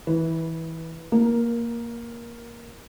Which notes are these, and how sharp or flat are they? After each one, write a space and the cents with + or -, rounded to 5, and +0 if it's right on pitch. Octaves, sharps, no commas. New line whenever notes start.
E3 -20 B4 +0
A#3 +0 A#4 +15